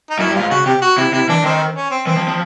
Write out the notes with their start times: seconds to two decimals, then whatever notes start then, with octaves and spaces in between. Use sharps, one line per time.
0.10 D#4
0.19 F#2 E4
0.30 G2
0.35 G#2 F4
0.50 C#3 F#4
0.66 C3 G4
0.82 F#4
0.97 C3 E4
1.13 C3 E4
1.29 E3 D4
1.44 D#3 C4
1.75 C#4
1.91 C4
2.07 E3 C4
2.17 F3
2.28 F3